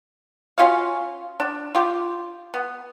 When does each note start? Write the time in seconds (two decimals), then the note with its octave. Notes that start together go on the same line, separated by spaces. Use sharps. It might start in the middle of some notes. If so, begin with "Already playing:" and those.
0.58 C#4 F4 F#4 F5
1.40 D4
1.75 F4 G4
2.54 B3